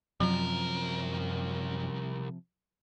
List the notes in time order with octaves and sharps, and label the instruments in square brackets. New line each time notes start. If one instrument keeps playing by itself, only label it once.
[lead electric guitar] C2 A#4 [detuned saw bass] F#2 [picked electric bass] C3 F3 [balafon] F#3